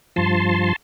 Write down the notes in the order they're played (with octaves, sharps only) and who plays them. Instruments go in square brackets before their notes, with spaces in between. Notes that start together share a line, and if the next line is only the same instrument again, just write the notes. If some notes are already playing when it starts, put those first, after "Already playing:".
[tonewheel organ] G2 F3 A5 C6